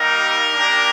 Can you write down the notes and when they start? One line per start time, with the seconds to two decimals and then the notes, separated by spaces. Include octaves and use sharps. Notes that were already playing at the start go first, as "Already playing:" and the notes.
Already playing: G3 A#3 D#4 G4 A#4
0.52 A#3 D4 G4